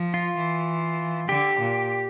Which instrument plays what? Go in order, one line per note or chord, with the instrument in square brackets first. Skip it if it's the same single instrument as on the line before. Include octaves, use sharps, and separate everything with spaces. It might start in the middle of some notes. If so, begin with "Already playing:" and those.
Already playing: [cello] F3
[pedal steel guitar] F4
[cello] E3
[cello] D3 [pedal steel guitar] G4
[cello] A#2